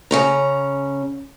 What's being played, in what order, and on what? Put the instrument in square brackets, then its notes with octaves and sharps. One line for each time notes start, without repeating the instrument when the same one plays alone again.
[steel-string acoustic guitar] C#3 C#4 A#5